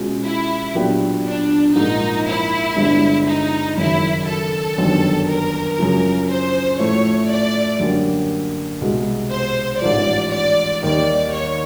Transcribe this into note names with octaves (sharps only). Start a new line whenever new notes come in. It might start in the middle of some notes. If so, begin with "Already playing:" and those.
Already playing: B2 G#3 C#4 F4
E4
A#2 F#3 B3 D4 G4
D4
A#1 G#2 F3 A#3 D#4
E4
G1 G2 D3 F3 G#3
D#4
F#1 F#2 D#3 E4
A4
G1 F#2 D#3 G3
A#4
F#2 C#3 F3
C5
A2 F3 A3 C#5
D5
F#2 D3 G3 A#3
C2 B2 G#3 B3
C5
A1 G#2 F3 D5
D5
D#2 D#3 G3 A#3 D#4 D5
C#5